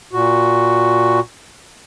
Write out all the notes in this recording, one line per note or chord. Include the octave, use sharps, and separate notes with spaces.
A#2 F#4